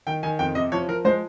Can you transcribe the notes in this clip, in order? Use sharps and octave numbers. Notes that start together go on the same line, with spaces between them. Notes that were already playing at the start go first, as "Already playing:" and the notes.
D#3 G5
D#3 G#5
F2 G5
C3 D#5
F3 C#5
F3 A#4
G#3 C5